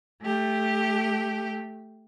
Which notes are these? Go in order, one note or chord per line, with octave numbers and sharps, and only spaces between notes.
A3 G4